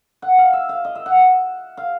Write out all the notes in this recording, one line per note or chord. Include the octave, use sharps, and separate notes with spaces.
F#5
F5
E5
F5
D#5
E5
F#5
F5